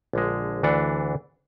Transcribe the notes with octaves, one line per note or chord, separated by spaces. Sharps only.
A#1 D3 G#3
D2 E3 D4 F#5